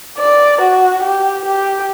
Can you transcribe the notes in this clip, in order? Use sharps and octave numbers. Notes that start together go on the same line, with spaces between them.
D5
F#4
G4
G4